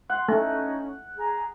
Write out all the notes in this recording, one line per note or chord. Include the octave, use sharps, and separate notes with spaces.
F#5 C6
A3 C#4 D#4
G#4 A#5